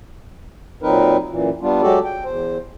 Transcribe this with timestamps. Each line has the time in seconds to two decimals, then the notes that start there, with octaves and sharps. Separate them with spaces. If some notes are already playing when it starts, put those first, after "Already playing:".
0.83 A#2 F#3 C4 D#4 A#4 B4
1.30 F#2 A#2 E3
1.61 G3 B3 D4 F4
1.82 F#3 G#3 F#4 G4 A4 D5
2.05 G5
2.25 E2 C5